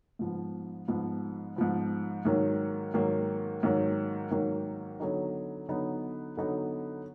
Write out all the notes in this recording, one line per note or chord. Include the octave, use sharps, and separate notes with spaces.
G#2 F3 B3
G#2 F3 B3
G#2 F3 B3
G#2 D#3 F#3 A#3
G#2 D#3 F#3 A#3
G#2 D#3 F#3 A#3
G#2 D#3 F#3 A#3
D3 F#3 B3 D#4
D3 F#3 B3 D#4
D3 F#3 B3 D#4